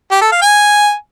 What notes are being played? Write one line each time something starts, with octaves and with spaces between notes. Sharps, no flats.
G4
A4
F5
G#5